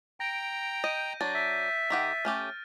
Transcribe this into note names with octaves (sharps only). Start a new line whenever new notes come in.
G5 A#5 A#6 D7
D#5 G6 A#6 D#7
F#3 D4 A6
E5
D#3 G4 F#5
A3 C#4 G4 F6